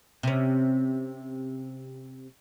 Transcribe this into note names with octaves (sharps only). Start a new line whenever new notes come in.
C3 C#4